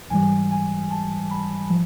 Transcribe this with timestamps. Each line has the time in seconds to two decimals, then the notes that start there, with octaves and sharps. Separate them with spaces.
0.10 G#2 E3 G3 G#5
0.51 G#5
0.91 A5
1.31 B5
1.70 F3